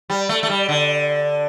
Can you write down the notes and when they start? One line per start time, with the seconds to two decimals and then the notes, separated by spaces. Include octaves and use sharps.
0.10 G3
0.29 A3
0.43 A3
0.49 G3
0.69 D3